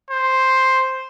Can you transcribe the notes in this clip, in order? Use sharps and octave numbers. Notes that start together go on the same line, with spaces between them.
C5